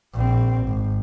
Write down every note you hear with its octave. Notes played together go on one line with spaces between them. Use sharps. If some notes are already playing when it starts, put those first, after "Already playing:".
A#1 C4
G#1